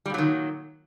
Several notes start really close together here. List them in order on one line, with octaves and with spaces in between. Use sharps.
G3 A#2 F#3 D#3